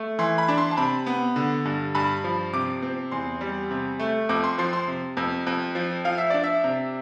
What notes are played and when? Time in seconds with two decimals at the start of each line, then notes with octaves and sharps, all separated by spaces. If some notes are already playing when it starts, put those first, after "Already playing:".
Already playing: A3
0.19 E3 C6
0.38 B5
0.48 D4
0.58 C6
0.71 A5
0.77 C3 B5
1.06 B3
1.36 D3
1.65 G2
1.95 G2 B5
2.24 F3
2.53 C3 D6
2.83 C4
3.11 E2 C6
3.41 G3
3.71 C3
3.99 A3
4.29 F2 D6
4.44 C6
4.58 F3 C6
4.73 C6
4.87 C3
5.17 F2
5.47 F2
5.75 F3
6.05 F3 F5
6.18 E5
6.30 D4 D5
6.44 E5
6.64 C3